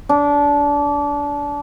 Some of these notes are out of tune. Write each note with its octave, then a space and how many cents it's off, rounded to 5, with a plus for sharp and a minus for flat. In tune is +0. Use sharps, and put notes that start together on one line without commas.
D4 -25